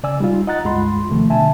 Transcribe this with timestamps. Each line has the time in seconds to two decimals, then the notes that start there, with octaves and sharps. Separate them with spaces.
0.03 C#3 D5 G#5 E6
0.20 G3 D#4 F4
0.47 D#5 F#5 A#5 F#6 A6
0.64 C#2 G2 G#3 F4 B5 C6
1.10 D#2 C3 D#3 F3 A3
1.29 B2 D3 E5 G#5 A5